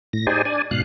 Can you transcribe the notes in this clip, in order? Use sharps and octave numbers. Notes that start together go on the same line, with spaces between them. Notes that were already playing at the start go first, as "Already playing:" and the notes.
A2 A#6
D#4 G4 G#4 C5 D5 G#5
D4 D5 G#5
G#2 B2 F5 F#6